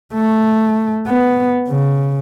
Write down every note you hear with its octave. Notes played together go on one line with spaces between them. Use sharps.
A3
B3
C#3